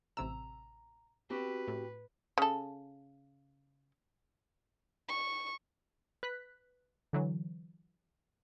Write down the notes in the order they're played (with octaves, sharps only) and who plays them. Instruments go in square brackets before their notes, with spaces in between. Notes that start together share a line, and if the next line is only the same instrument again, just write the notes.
[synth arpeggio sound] A1 C3 E6 [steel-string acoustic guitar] A#5
[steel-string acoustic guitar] C4 F#4 G4 [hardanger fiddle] B4
[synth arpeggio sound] A2
[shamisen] C#3 A4
[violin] C#6
[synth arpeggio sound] B4 F#6 B6
D3 E3 F#3